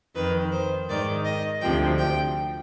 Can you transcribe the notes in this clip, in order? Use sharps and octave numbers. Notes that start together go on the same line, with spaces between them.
F2 D#3 B4
C5
G#2 D#3 D5
D#5
D2 C3 F3 G5
G5